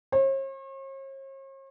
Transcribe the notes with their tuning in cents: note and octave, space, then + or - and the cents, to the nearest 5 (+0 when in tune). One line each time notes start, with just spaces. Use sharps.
C#5 -45